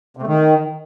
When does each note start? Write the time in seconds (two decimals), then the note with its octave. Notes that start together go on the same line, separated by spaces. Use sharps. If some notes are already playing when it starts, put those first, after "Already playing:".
0.17 C3
0.22 A3
0.27 D#3